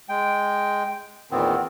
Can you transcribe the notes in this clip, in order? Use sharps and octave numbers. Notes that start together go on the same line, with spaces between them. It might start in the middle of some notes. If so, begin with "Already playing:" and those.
G#3 G5
E2 A#2 D#3 B3 C4